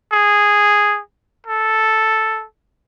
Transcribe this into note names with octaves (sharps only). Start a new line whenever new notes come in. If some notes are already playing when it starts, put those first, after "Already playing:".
G#4
A4